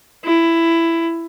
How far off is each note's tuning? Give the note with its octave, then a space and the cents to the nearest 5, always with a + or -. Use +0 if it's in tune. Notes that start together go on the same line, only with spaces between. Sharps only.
E4 +15